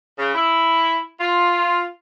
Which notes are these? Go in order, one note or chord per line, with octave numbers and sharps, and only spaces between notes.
C#3
E4
F4